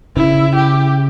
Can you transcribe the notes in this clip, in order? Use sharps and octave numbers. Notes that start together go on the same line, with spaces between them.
C#3 E4
G4